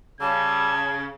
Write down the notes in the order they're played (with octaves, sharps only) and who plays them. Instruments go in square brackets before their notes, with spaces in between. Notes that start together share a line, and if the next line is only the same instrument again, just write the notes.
[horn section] C#3 [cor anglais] G3 [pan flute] A5 [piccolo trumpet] G#6